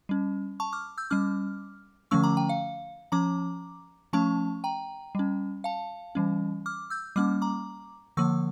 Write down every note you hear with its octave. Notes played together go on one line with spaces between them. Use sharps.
G3 C#4
A5 C#6
D6 F6
E6 G6
G3 C#4 D6 F6
D3 F3 A3 C#4 C#6 E6
A#5 D6
G5 A#5
F5
F3 C#4 A#5 D6
F3 A3 C#4 A5 C#6
G5 A#5
G3 C#4
F5 A5
E3 G3 C#4
D6 F6
E6 G6
G3 A#3 C#4 D6 F6
A#5 D6
D3 F3 A#3 C#6 E6